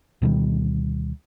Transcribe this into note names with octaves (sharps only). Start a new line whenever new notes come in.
D2 B2 D#3 G3